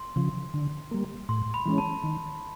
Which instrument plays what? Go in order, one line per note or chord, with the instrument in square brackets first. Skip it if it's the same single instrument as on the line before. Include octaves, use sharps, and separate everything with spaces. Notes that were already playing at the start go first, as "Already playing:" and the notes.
Already playing: [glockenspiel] C6
[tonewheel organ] C#3 F3
D3
G3 A#3
[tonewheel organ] A2 [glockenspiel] C6
[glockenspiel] B5
[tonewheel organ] E3 G#3 C#4
[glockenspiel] A5
[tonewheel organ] D#3